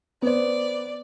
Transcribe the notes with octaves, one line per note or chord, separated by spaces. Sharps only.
B3 C5 D5